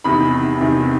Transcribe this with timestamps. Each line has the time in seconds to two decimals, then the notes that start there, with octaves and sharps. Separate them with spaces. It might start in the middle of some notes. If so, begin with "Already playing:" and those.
0.04 E2 C3 D#3 B5
0.61 E2 C3 D#3